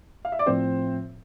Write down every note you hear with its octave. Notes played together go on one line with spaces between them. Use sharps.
F5
E5
D5
A2 F3 C4 C5